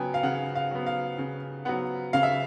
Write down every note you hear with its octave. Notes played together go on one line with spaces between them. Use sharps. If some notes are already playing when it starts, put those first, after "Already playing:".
Already playing: C#3 F#3 B3 G5 G#5
F5
C#3 F#5
F5
F#3 B3
F5
C#3
F#3 B3 F#5
C#3 F5
E5